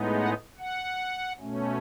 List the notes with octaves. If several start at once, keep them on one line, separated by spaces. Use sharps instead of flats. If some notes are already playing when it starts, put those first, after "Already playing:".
Already playing: A2 G#3 B3 D#4
F#5
F#5
B2 A3 C#4